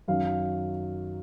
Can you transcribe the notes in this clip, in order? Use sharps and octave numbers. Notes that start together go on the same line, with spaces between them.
F#2 D#3 F#3 F5